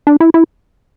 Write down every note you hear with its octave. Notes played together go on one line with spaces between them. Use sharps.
D4
E4
E4